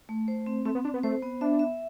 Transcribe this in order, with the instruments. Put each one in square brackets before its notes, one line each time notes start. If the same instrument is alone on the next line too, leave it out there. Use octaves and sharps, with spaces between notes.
[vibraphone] A3
C5
C4
[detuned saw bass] A3 [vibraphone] C4
[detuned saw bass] B3
[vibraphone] C4 [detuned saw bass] D4
[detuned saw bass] B3
[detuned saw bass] A3 [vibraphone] C5
[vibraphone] B3
[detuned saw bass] D4 [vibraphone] E5
[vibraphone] E5